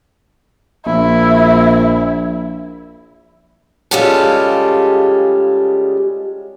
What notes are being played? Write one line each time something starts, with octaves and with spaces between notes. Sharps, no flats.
A#1 E4
C#3 G3 G#3 F4 G4 A4